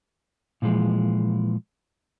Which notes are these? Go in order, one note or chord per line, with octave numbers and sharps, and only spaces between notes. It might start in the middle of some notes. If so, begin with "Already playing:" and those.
A#2 E3 F3 G#3